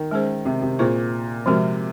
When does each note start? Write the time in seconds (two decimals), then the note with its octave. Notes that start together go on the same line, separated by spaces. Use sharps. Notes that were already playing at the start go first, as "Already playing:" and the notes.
Already playing: D#3
0.11 G#3 C#4 G#4 C5
0.45 C3
0.62 C3
0.79 A#2 C4 F4 G#4 C5
1.46 C3 F3 G#3 C4 F#4 A#4